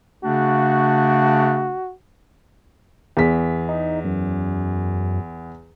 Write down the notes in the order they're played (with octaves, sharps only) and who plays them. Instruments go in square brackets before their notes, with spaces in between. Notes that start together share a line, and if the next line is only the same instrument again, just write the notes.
[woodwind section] C#3 A3 D4 [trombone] F#4
[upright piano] E2 B6
[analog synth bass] D#4
F#2